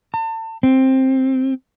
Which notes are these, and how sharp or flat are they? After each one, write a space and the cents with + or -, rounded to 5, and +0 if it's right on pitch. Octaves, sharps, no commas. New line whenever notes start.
A5 +35
C4 +10